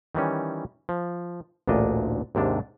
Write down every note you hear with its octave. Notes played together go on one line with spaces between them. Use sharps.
D#3 E3 G3 C#4
F3
A1 D2 A#2 D4 D#5
D#2 G#2 C3 D4